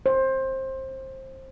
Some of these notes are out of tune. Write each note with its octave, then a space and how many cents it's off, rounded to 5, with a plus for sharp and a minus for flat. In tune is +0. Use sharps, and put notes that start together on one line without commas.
C5 +20